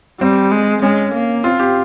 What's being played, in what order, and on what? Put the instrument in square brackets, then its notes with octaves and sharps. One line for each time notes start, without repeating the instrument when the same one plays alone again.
[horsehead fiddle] G3 [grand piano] C4
[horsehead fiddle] G#3
[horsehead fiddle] G#3 [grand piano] C#4
[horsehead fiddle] A#3
[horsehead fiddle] C4 [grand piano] F4
[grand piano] G4